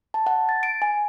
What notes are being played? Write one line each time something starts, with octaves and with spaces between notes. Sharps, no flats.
A5
F#5
A6
D7
G#5